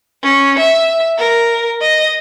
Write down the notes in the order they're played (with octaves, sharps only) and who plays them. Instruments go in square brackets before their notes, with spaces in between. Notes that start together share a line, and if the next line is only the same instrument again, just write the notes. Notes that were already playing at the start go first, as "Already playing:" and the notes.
[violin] C#4
E5
A#4
D#5